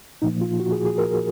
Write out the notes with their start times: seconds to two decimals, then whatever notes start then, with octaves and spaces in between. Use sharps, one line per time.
0.22 A#2 F3 A#3 D#4
0.41 F4
0.60 F#4
0.72 G#4
0.86 G#4
0.98 A#4